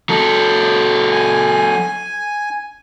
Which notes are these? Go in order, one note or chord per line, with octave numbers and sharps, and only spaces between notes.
F#3 A4
G#5